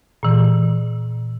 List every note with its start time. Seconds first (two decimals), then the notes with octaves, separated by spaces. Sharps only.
0.23 A#2 E3